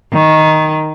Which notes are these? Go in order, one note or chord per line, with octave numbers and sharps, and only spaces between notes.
D#3